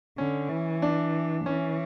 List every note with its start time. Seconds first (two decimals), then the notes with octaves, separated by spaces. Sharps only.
0.18 D3 C#4
0.49 E3
0.82 D4
1.45 E3 C#4